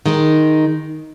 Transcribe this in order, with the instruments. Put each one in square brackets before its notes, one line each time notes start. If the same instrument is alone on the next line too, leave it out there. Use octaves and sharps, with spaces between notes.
[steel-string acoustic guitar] D#3 G#3 D#4